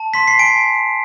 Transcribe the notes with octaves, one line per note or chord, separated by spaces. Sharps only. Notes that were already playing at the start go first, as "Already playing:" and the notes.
Already playing: A5
C6 B6
C7
G#5 D7